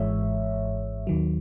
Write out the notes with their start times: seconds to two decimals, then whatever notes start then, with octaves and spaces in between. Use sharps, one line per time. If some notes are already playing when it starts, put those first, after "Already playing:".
Already playing: G#1 G#2 E3 G#3 C#5 E5
1.07 D#2 D#3 F#3